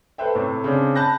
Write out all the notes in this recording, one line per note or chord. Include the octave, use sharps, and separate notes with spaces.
A4 B4 C5 E5 G5
A2 C3
C#3 C4 D4
A5 B5 F#6 G6 A#6